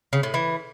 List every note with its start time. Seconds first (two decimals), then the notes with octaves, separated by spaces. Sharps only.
0.13 C#3
0.23 A2
0.34 E3